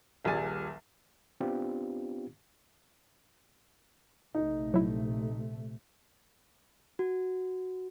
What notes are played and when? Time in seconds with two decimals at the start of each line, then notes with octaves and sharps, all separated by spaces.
0.25 D#1 A#1 G3 G#4 G#5 A6
1.40 B3 C4 D4 F4 G4
4.35 A#1 C3 A3 D#4
4.74 F#3 E4
6.99 F#4